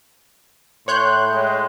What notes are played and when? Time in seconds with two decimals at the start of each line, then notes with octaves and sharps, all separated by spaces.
0.88 A2 C#5 C6 F#6 G6
1.32 G#3